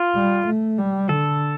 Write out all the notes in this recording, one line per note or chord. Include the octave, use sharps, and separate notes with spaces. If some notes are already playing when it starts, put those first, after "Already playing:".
Already playing: F4
G3
A3
G3
D3 A4